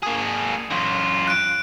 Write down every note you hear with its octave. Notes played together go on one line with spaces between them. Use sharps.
A#3 G#4
F#2 F4
F#6 D7